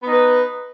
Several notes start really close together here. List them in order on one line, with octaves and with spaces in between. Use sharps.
B3 D#4 B4